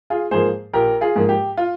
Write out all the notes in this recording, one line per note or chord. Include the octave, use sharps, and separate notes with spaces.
F4 G#4
G#2 F3 A#3 G#4 C5
A#1 G4 A#4
F4 G#4
G#2 F3 A#3
G4
F4